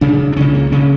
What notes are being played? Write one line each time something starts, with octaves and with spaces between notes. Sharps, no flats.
D2 C#3 D4
D4
C#2 C#3 C#4
A#3
D2 C#3 C#4